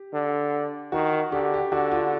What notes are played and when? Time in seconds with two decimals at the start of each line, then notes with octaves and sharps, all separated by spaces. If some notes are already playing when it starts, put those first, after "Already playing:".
Already playing: G4
0.13 D3
0.92 D#3 F#4
1.32 D3 G4
1.54 G4
1.72 D3 F#4
1.91 F4